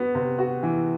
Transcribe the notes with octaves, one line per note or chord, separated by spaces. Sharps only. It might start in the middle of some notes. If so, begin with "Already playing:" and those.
Already playing: B3 F#4
C3
F#4
E3